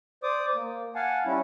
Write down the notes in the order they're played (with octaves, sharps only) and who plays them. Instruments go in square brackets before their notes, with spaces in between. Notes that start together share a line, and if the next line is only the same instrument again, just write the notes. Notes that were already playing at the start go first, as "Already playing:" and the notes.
[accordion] C5 D5 D6 D#6
A#3
F5 F#5 G#5 A5
G3 C#4 E4